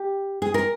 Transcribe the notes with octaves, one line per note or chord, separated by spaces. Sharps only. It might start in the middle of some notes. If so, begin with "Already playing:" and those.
Already playing: G4
G#4
A#4